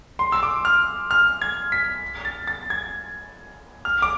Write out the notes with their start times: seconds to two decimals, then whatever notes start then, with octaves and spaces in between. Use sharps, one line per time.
0.19 C6
0.32 E6
0.43 D6
0.65 F6
1.11 F6
1.42 G#6
1.72 B6
2.25 A6
2.47 A6
2.70 G#6
3.85 F6
4.02 D6